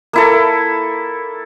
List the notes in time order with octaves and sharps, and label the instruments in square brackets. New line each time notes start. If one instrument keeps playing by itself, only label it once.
[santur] A#3 E4 A4